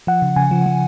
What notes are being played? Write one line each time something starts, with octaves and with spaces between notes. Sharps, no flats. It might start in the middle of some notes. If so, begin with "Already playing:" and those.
F3 F#5
C#3
C#3 G#5
F3
F3